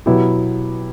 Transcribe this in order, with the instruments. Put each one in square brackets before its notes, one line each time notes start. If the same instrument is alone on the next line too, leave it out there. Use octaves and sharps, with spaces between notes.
[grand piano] B2 F#3 B3 E4 G4